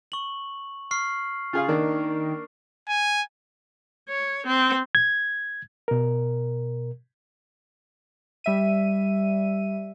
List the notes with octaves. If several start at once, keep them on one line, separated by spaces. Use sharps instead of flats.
C#6 F#7
C#6 F6 C7
C#3 F4 G#4 F5
D#3 A#3 D4 A#4
G#5
C#5
C4
G#6
B2 A#4
G3 E5 D#7